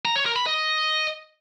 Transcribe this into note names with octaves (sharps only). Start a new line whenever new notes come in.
A#5
C#5
A#4
B5
D#5